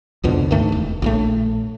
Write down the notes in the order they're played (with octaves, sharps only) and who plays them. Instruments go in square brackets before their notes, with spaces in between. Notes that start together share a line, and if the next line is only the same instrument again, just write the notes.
[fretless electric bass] C2 F2 B2 D3
D2 G#2 D#3 A3
E1
A#1 A2 A3